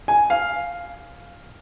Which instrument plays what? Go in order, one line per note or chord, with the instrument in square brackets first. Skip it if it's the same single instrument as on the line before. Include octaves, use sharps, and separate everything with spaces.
[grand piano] G#5
F5